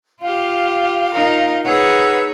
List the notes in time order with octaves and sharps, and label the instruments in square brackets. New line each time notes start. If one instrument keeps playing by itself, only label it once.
[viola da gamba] F4 G4 [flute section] F5
[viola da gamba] D#4 F4 A#4
[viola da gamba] D#4 G#4 C#5 [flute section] B4 F#5 E6